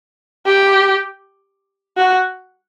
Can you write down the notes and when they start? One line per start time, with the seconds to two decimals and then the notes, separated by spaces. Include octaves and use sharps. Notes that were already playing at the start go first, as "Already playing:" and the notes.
0.46 G4
1.97 F#4